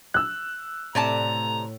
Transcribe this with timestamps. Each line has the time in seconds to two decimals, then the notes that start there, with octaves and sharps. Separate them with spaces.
0.14 E6 F#6
0.95 A2 C3 D5 A5 A#5